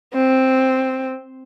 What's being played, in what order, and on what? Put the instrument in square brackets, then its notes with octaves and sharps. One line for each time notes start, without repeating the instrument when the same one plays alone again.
[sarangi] C4